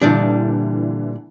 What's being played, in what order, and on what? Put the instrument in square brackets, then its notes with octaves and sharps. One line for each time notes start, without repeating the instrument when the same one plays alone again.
[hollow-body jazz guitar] A#2 G3 D4 [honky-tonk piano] D3 E3